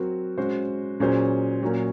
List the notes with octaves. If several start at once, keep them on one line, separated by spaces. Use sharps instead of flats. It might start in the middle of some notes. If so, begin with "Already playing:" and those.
Already playing: F#3 C4 F#4 A#4
G#3 C#4 F#4 C5
A#2 F#3 C#4 G#4 C5
A#2 F#3 A#3 C#4